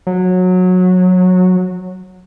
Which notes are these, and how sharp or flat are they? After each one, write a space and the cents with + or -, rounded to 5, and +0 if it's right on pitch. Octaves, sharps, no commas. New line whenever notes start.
F#3 -20